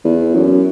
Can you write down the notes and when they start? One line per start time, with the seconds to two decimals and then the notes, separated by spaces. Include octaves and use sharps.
0.04 E2
0.35 F#2